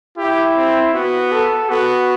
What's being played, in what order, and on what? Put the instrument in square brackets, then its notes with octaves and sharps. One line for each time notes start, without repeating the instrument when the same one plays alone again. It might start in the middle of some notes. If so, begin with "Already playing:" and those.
[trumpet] E4 [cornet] G4
[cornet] C4
[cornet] B3 [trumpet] F#4
[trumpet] A4
[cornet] B3 [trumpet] F#4